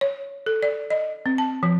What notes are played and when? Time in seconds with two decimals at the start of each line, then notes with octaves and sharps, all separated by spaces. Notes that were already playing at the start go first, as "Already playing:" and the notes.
0.01 C#5
0.46 A4
0.63 D5
0.90 D#5
1.26 C4
1.38 A5
1.63 F3